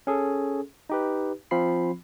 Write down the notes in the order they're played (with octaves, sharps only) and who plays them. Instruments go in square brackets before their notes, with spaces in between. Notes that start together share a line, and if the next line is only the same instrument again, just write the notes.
[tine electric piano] C#4 G#4 A4
D#4 G4 B4
F3 C4 F4 B5 C7